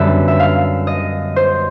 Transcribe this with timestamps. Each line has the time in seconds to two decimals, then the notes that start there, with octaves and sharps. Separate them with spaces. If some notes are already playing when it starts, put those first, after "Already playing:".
Already playing: F#2 D3 G3 B3 E5
0.28 E5
0.39 F5
0.87 D#5
1.36 C5